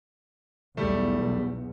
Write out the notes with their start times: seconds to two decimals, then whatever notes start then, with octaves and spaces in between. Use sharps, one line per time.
0.77 B1 E2 G3 A3